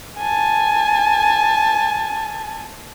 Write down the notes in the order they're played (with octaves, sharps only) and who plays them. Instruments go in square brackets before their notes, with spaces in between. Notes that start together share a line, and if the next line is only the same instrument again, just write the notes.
[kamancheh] G#5 A5